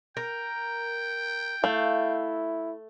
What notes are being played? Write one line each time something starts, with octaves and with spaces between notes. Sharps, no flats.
A#4 G5
A3 E4 F5